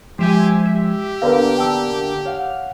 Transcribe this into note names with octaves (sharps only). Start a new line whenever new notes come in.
F3 G#3 G4 C5 E5 G#5
G4 E5
D3 A#3 B3 A#4 B4 F5 A#5
G5 A5 E6
C#5 F5 F#5 F6